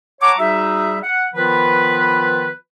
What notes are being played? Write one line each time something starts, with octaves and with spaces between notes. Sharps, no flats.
C#5 F#5 A5 A#5 C#6 D6
G3 D#4 F#4 G#4 E5
F#5
D#3 F3 B3 F4 B4